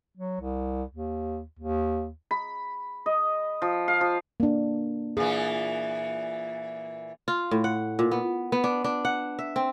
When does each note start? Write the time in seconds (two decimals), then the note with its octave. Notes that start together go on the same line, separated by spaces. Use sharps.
0.17 F#3
0.41 C2
0.91 D#2
1.59 D#2
2.31 B5
3.06 D#5
3.62 F3
3.88 F5
4.01 F3
4.40 A#3 D4
5.17 A#2 E3 G#4
7.28 F4
7.51 A2
7.64 F#5
7.99 A#2
8.11 B3
8.52 B3
8.64 D4
8.84 D4
9.05 F#5
9.39 E5
9.56 C4